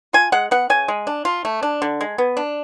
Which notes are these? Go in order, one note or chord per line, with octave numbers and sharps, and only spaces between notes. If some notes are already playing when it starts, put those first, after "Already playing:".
F4 G#5
G#3 F#5
B3 F#5
C#3 G#5
G#3
D4
F4
A3
D4
D3
G#3
B3
D4